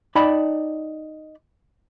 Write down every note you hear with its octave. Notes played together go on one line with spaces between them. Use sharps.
D#4 D5 G5 A5 B5